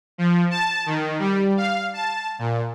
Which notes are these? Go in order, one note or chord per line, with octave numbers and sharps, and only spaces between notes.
F3
A5
D#3
G3
F5
A5
A#2